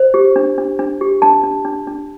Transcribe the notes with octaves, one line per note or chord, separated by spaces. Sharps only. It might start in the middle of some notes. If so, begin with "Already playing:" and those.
Already playing: C5
G4
D4
D4
D4
G4
D4 A5
D4
D4
D4